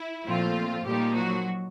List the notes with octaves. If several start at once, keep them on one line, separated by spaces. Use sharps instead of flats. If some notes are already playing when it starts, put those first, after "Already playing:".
Already playing: E4
A#2 F3 A3 C4 F4
A#2 F3 G3 A#3 D#4 G4
F#3 F#4